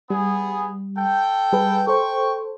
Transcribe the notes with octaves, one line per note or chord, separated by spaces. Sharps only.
G3 B3 G#4
A4 G5
G3 G#4 B4
A4 C5 G5 C#6